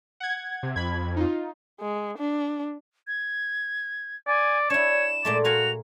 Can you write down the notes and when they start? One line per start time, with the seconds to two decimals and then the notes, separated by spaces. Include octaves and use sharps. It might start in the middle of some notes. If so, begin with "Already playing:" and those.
0.20 F#5 G#6
0.63 C3
0.76 F2 B5 G#6
1.16 D#4 F4
1.80 G#3
2.18 D4
3.07 G#6
4.27 D5 G#5
4.70 D4 E4 C#5 E7
5.25 A#2 G#3 A3 D5
5.45 F#4 A#4 F5 G#5 F7